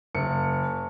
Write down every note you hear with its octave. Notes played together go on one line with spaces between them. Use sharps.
F#1 C#7